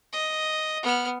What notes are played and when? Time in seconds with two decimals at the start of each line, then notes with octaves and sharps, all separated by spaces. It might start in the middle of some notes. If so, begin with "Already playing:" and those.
0.13 D#5
0.83 B3 F6